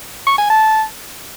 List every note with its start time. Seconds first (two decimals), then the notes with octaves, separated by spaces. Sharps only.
0.27 C#6
0.39 G#5
0.50 A5